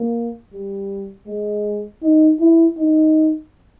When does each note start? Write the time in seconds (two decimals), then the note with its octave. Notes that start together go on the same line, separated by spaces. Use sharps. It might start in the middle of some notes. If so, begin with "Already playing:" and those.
Already playing: A#3
0.53 G3
1.27 G#3
2.03 D#4
2.40 E4
2.77 D#4